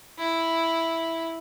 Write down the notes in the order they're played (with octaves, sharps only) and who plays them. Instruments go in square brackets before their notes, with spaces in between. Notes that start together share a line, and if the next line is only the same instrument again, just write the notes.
[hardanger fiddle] E4